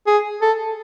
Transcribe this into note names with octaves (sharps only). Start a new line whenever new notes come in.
G#4
A4